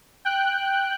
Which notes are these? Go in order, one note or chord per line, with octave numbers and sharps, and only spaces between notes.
G5 F#6